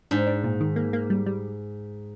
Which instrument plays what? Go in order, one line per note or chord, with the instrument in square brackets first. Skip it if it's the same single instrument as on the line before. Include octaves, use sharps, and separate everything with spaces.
[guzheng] G#2 [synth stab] D4
[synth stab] D4
A#2
D#3
A#3
A#3
G3
G3